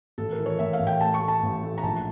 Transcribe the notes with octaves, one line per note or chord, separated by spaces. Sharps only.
A1 A4
A#4
E3
C#5
A2 E5
F5
A1
G5
A3 A5
C#6
A3
A5
A1
A3
A#5
A#1 A5